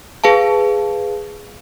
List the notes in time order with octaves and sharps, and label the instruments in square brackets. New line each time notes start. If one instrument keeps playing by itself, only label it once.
[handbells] G#4 B4 F5 A5